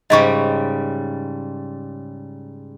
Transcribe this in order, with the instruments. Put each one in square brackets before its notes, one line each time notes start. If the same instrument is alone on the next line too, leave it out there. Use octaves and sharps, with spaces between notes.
[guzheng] G#2 C#3 G3 [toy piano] D#5 C#6